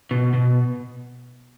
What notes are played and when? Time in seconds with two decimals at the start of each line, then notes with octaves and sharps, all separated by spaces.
0.11 B2
0.33 B2